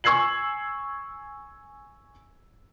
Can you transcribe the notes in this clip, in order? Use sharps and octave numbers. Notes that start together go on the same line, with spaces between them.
G#5 C#6 E6 G#6 C7 F#7